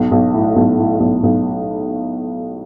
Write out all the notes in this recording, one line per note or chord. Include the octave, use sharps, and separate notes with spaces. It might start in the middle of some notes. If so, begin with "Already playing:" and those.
Already playing: B1
B1
A2
B1
A2
B1
B1